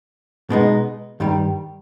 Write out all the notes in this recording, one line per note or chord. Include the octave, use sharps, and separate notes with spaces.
B2 G#3 B3 D#4
G2 D#3 G3